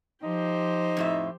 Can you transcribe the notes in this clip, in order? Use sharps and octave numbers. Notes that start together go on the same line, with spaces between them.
F3 D#4 G4 C5
F2 A2 E5